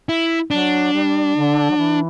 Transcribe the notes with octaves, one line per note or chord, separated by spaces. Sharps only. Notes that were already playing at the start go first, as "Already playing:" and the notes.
E4
F#3 D4
G3
D3
F#3
E3